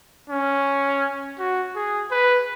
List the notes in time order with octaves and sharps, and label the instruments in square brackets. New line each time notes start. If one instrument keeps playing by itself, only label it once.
[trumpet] C#4
F#4
G#4
B4